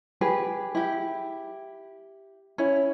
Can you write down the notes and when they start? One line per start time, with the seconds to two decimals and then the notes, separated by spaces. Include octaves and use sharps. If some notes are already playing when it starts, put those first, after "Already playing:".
0.21 G4 G#4 B4
0.75 E4 G4
2.58 C#4 E4